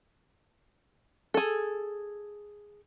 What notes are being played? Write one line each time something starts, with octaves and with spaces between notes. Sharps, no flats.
G#4 A4